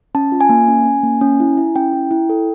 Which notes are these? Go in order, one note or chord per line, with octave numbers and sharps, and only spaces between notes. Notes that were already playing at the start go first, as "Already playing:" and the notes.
C#4 A5
F4
G#5
A#3
C#4
C#4
A#3
C#4
E4
E4
C#4 G5
E4
E4
A4